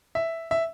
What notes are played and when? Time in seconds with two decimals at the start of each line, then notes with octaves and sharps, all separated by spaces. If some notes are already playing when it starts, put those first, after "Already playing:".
0.15 E5
0.51 E5